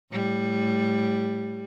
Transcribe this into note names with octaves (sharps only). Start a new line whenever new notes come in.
A2 G3